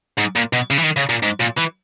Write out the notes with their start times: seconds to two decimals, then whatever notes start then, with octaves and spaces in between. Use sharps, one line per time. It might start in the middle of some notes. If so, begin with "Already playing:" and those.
0.18 G#2
0.36 A#2
0.53 B2
0.71 C#3
0.78 E3
0.84 D#3
0.97 C#3
1.10 A#2
1.23 G#2
1.40 A#2
1.58 E3